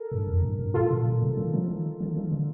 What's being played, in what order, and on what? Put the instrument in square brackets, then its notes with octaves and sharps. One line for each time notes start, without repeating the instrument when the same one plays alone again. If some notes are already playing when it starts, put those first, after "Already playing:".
Already playing: [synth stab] A4 A#4
[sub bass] G2
F2
G2
G2
[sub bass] A2 [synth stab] F4 A4
[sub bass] A#2
A#2
C3
D#3
F3
D#3
D#3
D#3
D3